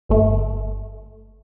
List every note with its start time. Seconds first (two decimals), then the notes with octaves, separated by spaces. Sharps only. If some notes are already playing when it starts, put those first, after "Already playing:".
0.09 G1 A3